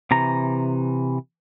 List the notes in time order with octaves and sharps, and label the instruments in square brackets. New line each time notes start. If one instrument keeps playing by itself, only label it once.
[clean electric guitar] C3 E3 A#5